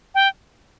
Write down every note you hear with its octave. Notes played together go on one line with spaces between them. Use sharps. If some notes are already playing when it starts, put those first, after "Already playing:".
G5